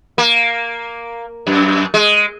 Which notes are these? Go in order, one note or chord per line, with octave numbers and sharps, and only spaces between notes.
A#3
F#2
G#3